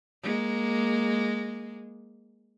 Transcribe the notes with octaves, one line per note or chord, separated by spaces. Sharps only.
G#3 A#3